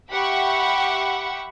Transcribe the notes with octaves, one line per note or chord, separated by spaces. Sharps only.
G4 E5 F#5 B5 C#6